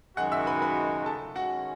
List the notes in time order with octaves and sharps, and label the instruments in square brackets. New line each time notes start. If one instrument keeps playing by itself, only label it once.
[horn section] F#2 D#3 G#3 D#4 F#4 [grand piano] F#5 F#6
[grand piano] E5 E6
B4 B5
B4 B5
A4 A5
[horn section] D#3 G#3 C#4 [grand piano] F#4 F#5